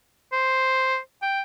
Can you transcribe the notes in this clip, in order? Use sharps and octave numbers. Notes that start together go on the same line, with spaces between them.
C5
G5